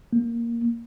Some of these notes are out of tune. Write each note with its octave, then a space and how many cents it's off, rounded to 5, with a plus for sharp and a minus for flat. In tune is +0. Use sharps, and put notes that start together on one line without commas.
A#3 +0